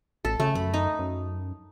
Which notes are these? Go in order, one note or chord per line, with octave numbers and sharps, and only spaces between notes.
A1 A4
C#3 A3
F#2 B5
D#4
F#2